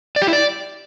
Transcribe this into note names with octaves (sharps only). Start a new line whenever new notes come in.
D5
G4
E4
D5